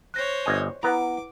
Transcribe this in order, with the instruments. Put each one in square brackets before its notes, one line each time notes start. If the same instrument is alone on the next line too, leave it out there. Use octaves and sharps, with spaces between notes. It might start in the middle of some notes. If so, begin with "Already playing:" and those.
[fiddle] C5 C#5 [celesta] F#6 A#6
[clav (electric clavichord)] G1 D#5 G#5
[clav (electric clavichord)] B3 A#5 [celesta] E4 B4 F#5 [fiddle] D6